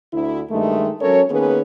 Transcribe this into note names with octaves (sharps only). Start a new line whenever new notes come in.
D2 E4
G2 D#3 G#3 A3
F#3 C#4 A4 A#4 C#5
D#3 A#3 B3 C#4 G#4 B4